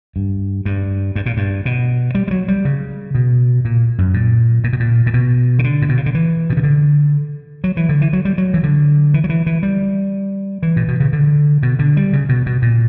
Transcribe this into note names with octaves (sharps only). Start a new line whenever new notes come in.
G2
G2
G2
A#2
G2
B2
G3
G3
F#3
G3
C#3
B2
A#2
F#2
A#2
A#2
B2
A#2
A#2
B2
C#3
D3
A#2
B2
C#3
D3
E3
B2
C#3
D3
F#3
E3
D3
E3
F#3
G3
F#3
E3
D3
E3
F#3
E3
E3
G3
E3
A#2
B2
C#3
D3
B2
D3
G3
C#3
B2
B2
A#2